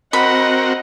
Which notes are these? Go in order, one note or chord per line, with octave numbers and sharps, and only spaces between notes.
C4 F#4 A#4 D#5 F#5 B5